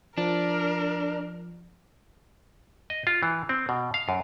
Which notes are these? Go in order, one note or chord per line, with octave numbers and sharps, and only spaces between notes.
F3 D4 A#4
D#5
F4
E3
C4
B2
F5
F#2